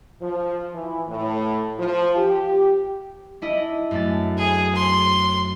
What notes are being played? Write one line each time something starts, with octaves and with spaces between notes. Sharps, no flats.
F3
E3
A2
F3
G4
D4 E4 D#5
F#2 A3 A6
G#4
C6